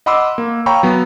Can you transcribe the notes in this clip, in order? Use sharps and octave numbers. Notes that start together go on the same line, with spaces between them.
D#5 F#5 B5 C6 D6 E6
A#3
C#5 F5 G5 A#5 B5 C#6
F#3 B3